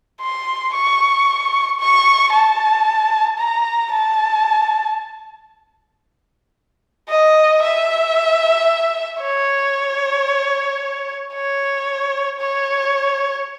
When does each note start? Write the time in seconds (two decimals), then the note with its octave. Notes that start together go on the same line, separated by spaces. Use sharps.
0.21 C6
0.74 C#6
1.80 C#6
2.32 A5
3.39 A#5
3.92 A5
7.09 D#5
7.62 E5
9.21 C#5
11.34 C#5
12.39 C#5